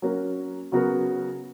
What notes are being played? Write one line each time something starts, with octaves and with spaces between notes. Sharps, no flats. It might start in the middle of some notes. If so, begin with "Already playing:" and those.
F#3 A#3 C#4 F#4 A#4
C#3 F#3 B3 F#4 A#4